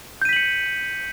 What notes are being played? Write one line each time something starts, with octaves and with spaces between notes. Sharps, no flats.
G6 B6 C#7 D#7 F#7